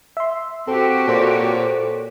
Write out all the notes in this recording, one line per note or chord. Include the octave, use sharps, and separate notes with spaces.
E5 C6
C4 F#4 G4 A4
A#2 A4 C5 C#5